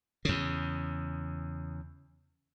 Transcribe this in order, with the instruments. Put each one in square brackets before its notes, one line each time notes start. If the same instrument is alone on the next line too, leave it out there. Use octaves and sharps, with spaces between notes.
[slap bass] E2 C#3